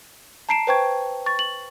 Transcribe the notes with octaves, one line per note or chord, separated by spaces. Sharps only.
A5 A#5 C7 D7 E7
B4 C5 G5 C#6 G#6
C#6 A6
F#7